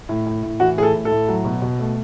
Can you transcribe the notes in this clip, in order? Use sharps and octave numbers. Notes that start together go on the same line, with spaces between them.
A2
A2
A2
E3 F#4
A2 G#4
A4
A2
A4
A2
F#3
B2
B2
A3